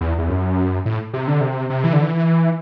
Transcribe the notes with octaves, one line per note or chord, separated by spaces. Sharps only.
E2
E2
F#2
A2
C3
D3
C3
C3
E3
D3
E3